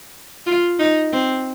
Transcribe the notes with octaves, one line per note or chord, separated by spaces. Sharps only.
F4
D#4
C4